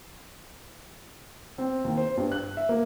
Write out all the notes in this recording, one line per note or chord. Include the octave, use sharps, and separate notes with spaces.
C4
D#2
C5
G2
F#6
E5
A#3